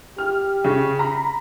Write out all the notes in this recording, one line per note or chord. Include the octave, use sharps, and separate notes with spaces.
G4 F6
C#3
A#5 B5